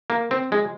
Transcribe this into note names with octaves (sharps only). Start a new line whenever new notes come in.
A#3
C4
G#3